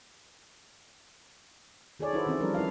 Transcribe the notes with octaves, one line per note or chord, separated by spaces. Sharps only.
D#3 G#4 A4 C#5 D5
D4 E4 F#4 A4 B4 C5
D#3 E3 C4 C#4 E4
F3 G3 D4 A#4
E4 B4 F5